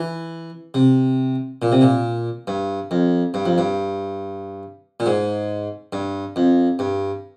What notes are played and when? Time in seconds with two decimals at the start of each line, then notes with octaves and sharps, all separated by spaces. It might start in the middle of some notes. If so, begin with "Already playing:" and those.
Already playing: E3
0.74 C3
1.62 A#2
1.72 C3
1.81 A#2
2.47 G2
2.91 F2
3.34 G2
3.46 F2
3.58 G2
5.00 A#2
5.06 G#2
5.93 G2
6.36 F2
6.79 G2